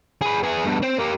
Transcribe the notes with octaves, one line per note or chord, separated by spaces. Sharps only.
G#4 B4
E3 G#4
G2 B2
C4 C5
A#3 G4